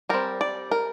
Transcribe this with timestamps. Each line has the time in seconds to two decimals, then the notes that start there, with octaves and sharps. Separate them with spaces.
0.09 G3 C4 A#4
0.41 D5
0.71 A#4